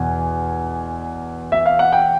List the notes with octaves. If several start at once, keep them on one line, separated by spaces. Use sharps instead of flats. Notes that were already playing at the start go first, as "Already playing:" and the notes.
Already playing: E2 B2 G#5
E5
F5
F#5
G5